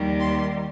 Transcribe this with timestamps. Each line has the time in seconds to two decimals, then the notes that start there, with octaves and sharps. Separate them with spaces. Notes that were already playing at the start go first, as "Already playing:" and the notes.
Already playing: D#2 D#3 G3
0.20 C6